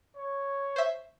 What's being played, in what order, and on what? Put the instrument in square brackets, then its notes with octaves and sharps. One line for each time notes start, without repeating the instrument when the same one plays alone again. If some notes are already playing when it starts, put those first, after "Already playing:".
[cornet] C#5
[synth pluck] C5 E5